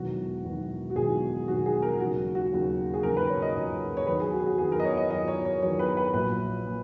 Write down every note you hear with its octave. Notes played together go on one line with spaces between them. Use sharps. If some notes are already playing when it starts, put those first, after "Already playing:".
Already playing: E1 E2 D#3 F#3 F#4
E1 E2 D#3 F#3
F#4
E1 E2 D#3 F#3 G#4
E1 E2 D#3 F#3 F#4
G#4
A#4
D#2 C#3 F#3 F#4
F#4
D#2 C#3 F#3
G#4
D#2 C#3 F#3 A#4
B4
C#5
D#5
D#2 C#3 F#3 D#5
C#5
E2 D#3 F#3 B4
G#4
F#4
G#4
F#4
E2 D#3 F#3 G#4
A#4
D#5
C#5
D#5
E2 D#3 F#3 D#5
C#5
C#5
E2 D#3 F#3 C#5
B4
B4
A#1 A#2 F#3 B4
A#2